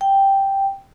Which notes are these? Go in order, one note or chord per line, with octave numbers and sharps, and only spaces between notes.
G5